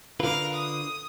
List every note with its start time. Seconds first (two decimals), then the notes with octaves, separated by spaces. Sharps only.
0.20 D3 F4 A#4 B4 F5
0.53 D#6